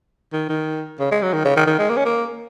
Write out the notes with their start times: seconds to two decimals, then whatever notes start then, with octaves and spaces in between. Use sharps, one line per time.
0.33 D#3
0.49 D#3
1.00 C#3
1.12 G#3
1.22 F#3
1.33 D#3
1.45 C#3
1.56 D#3
1.67 D#3
1.78 G#3
1.90 A#3
1.97 C#4
2.05 A#3